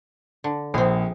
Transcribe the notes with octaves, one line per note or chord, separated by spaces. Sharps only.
D3
A#1 C4 G#4